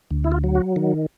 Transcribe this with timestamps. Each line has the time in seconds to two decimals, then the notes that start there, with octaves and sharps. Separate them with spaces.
0.11 D2
0.24 E4
0.32 F4
0.44 F#3
0.55 F#4
0.76 D#3